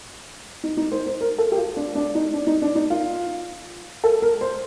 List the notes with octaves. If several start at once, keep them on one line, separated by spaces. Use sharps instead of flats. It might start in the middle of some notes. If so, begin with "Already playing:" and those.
D#4
D#4
C5
C5
A#4
A4
G4
F4
D4
D4
D#4
D4
D#4
D4
D#4
F4
A4
A#4
C5